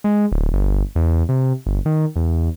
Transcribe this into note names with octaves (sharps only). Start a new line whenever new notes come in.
G#3
D1
G1
E2
C3
G1
D#3
E2